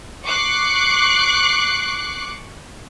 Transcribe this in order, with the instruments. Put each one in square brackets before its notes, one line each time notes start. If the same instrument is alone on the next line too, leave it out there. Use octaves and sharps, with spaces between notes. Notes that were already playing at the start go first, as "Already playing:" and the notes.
[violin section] C#6 D6 F#6 C7